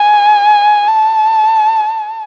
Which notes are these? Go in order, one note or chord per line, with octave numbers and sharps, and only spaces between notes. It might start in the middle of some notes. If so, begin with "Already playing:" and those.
Already playing: G#5
A5